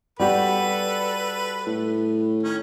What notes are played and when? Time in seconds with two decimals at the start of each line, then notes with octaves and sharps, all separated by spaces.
0.20 G3 F#4 G4 A4 B4 B5
1.67 A2
2.43 D#3 C#4